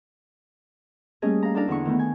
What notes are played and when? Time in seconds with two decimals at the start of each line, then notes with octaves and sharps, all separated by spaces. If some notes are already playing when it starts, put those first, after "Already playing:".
1.22 G3 A3 A#3 C#4 G#4 D#5
1.43 F5 A#5
1.55 D4 E4 A4 D5 F5 A#5
1.68 E2 D3 D4 E4 C#6
1.85 D#3 A3 B3
1.99 G#5